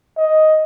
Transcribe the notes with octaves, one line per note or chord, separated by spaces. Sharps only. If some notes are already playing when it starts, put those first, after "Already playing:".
D#5